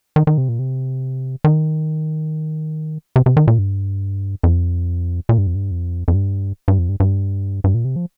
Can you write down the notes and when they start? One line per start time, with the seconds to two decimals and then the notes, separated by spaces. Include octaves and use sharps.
0.16 D#3
0.27 D#3
0.38 C3
0.49 A#2
0.59 C3
1.44 D#3
3.16 C3
3.26 C3
3.37 D#3
3.48 A#2
3.59 G2
4.43 F2
5.29 A#2
5.38 G2
5.47 F2
5.55 G2
5.71 F2
6.08 F2
6.14 G2
6.68 G2
6.78 F2
6.89 G2
7.00 G2
7.64 G2
7.74 A#2
7.85 C3
7.96 F3